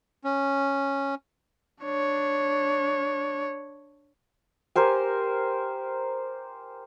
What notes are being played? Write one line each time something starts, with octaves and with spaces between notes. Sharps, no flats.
C#4
D4 C#5
G4 A#4 C5 G#5